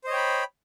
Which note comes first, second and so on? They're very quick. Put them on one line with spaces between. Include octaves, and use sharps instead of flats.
C5 D#5 C#5 G5 B5